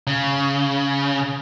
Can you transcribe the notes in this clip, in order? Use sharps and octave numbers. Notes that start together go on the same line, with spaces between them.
C#3